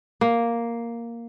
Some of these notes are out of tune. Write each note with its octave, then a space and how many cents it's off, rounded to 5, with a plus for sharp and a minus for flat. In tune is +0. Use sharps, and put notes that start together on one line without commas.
A#3 +0